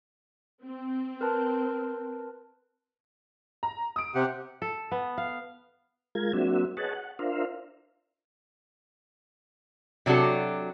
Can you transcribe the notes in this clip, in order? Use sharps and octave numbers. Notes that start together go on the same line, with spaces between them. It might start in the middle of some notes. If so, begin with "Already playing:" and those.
C4
A#4 B4 A5
A#5
D#6 D7
C3 G4 F#5
A4
B3
F5
G#3 F4 A#4 G#6
F#3 A#3 C4 D4 F#4 E5
G#4 B4 C#5 D#5 F#5 A5
F#5
D4 F4 A#4 C5 E5 F5
C3 F#3 D4 F#4 A4